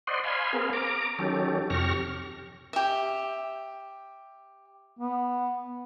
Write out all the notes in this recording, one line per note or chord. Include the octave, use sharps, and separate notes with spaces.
C5 D5 D#5 F#5 C6
F5 G#5 B5 C6
B3 C4 G#4 A#4 F5
A#5 D6
D#3 F#3 C#4 G4 A4
F2 C3 G4 C#6 F6 A#6
G4 E5
B3